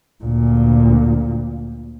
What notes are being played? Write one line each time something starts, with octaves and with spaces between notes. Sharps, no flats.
D2 A#2